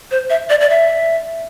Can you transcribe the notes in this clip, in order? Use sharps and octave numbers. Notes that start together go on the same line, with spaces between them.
C5
E5
D5
D5
E5